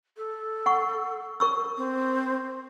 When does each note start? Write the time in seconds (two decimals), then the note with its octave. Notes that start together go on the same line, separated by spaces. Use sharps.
0.17 A4
0.66 F#5 C#6
1.40 A#4 C#6 E6
1.77 C4